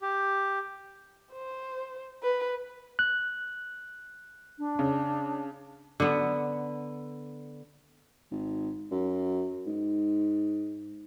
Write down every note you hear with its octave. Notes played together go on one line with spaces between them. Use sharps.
G4
C5
B4
F#6
D4
C#3
D3 B3
G#1
F#2
G#2